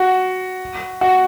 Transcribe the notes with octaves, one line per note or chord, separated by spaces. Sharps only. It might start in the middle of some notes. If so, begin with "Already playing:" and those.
Already playing: F#4
F#4